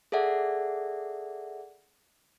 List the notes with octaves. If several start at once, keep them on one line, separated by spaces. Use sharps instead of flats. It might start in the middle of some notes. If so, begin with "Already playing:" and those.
G#4 A4 D5 E5 F#5